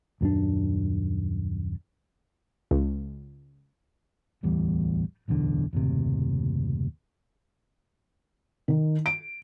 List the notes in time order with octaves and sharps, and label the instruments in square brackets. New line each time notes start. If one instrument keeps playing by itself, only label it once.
[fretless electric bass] D#1 F#2 C4 D4
[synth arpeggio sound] C#2
[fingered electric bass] D1 A1 E2 G3
D1 B1 E2 D3
F#1 D#2 A2 C3
[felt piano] D#3
D7